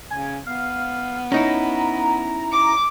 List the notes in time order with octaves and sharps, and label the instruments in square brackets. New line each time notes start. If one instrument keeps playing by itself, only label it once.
[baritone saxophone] C#3 [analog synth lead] G#5
[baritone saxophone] B3 [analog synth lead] F5
[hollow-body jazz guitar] C#4 D#4 E4 [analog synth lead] A#5
[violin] D6